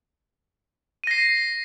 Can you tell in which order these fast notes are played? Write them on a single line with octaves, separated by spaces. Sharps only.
D#7 A#6 C7